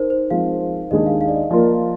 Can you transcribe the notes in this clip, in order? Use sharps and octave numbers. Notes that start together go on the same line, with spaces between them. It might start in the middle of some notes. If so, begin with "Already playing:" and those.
Already playing: D#4 A#4 C5
C5
F3 G#3 C4 F5
D#2 D#3 G#3 D4 G#4 D#5
F5
F5
D5
D#5
F3 A#3 F4 A#4 D5